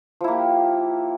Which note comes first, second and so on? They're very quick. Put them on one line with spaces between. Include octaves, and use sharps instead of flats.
F3 E4 A#3 G4